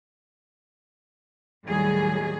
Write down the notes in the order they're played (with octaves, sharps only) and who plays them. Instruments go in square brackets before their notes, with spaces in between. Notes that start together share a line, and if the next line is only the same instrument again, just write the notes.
[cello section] D#2 A2 F#3 G3 G#4